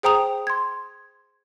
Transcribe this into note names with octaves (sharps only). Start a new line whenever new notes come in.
G#4 C5 G5 A#5 D#6 F7
C6 G#6